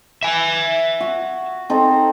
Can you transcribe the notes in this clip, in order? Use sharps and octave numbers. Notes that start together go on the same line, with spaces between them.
E5 G#5
F#4
C4 D#4 A4